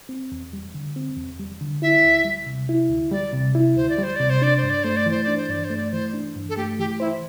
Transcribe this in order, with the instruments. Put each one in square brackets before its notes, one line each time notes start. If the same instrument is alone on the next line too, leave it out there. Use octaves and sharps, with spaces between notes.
[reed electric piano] C4
E2
G3
D3
C4
E2
G3
D3
[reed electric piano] E4 [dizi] E5
[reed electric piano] D2
G3
C3
E4
D2
[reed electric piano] G3 [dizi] D5
[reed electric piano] C3
E4
[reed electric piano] D2 [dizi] C5
[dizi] D5
[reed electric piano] G3
[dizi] C5
[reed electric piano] C3 [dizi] D5
[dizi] C5
[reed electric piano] D4 [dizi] D5
[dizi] C5
[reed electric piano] G2
[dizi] D5
[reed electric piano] A3 [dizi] C5
[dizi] D5
[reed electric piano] E3 [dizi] C5
[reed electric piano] D4 [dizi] D5
[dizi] C5
[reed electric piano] G2 [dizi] D5
[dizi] C5
[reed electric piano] A3
[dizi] D5
[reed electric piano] E3 [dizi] C5
[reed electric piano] D4
G2
[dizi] A4
[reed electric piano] A3 [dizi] G4
[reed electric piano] E3 [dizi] G4
[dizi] E4 [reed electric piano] C5